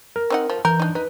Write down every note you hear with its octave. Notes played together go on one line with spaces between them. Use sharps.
A#4
C4 D#4 F#5
F3
E3 A#4 G6
D4 D#4
D#4 B4